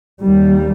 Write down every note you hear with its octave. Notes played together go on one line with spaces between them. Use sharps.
D#2 G3